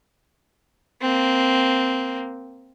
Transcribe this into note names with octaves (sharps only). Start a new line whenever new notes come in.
A#3 C4